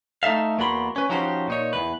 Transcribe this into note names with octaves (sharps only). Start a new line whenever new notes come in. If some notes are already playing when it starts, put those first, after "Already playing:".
A3 D#4 A4 E5 F5
E2 A#3 B3 F#4 B5 C6
C#4 B4
F3 C#4 D#4 F#4 G4 C5
A#2 D#4 C#5
E2 B4